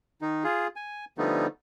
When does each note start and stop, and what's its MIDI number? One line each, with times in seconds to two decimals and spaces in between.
0.21 0.44 51
0.21 0.44 63
0.44 0.67 65
0.44 0.67 68
0.76 1.05 80
1.18 1.47 50
1.18 1.47 53
1.18 1.47 55
1.18 1.47 57
1.18 1.47 59
1.18 1.47 63